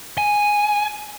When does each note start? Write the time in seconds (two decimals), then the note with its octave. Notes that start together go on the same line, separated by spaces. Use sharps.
0.18 G#5